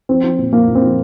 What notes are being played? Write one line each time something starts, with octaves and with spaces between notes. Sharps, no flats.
F3 C4
F3
A#2
F3 A#3
A#2
C4
F3